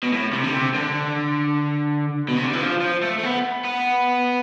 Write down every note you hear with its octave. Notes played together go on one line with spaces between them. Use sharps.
B2
A2
C3
D3
C3
D3
B2
C3
D3
E3
F3
F3
A3
A3
B3
B3